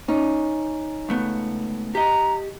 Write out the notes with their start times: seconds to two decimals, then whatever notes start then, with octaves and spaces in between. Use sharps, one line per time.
0.08 C#4 D#4
1.09 C#2 A3 B3
1.95 G4 D#5 A#5